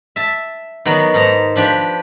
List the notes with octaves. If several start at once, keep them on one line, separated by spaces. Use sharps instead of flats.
E5 A5
D#3 F#3 B3 D5
G#2 A5 A#5
F3 D4 G4 B4